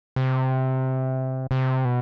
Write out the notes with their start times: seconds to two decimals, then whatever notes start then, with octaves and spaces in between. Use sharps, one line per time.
0.16 C3
1.51 C3
1.85 B2